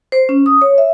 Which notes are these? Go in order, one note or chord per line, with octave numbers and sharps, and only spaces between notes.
C5
C#4
D#6
C#5
E5